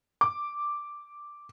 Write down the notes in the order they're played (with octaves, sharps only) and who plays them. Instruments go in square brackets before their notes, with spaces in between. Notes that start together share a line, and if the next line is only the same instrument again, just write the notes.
[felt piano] D6